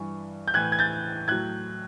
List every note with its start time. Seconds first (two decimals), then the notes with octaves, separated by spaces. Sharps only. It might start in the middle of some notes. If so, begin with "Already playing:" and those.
Already playing: G2 E3 C#6
0.48 G6
0.54 A2 E3 F#6 G#6
0.72 G#6
0.79 G6 A6
1.27 A2 F#3 F#6 G#6